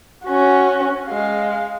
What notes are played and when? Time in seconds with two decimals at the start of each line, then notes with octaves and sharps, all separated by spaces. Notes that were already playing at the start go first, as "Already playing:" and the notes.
0.25 C#4 F#4
1.08 G#3 F5